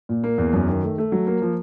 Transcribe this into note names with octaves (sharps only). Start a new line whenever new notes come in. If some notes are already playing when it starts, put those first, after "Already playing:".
A#2
A#3
E2
F#2
D#3
A3
A3
F#3
A#3
F3